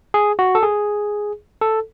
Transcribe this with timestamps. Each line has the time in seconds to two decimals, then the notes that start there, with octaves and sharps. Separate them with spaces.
0.14 G#4
0.39 F#4
0.55 A4
0.63 G#4
1.62 A4